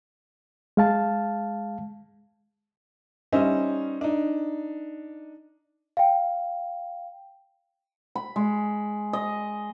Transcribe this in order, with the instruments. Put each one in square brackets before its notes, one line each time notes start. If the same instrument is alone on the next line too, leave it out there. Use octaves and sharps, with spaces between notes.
[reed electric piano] G#3 F5 A5
[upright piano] G3 C#4 D#4 C5 D#5 E5
D4 D#4
[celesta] F5 G5
[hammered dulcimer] B5
G#3
D#5